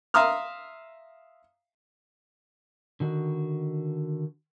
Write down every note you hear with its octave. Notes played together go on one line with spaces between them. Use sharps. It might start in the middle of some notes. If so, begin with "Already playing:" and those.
E5 F5 A#5 C6 D#6 F6
D3 D#3 F#4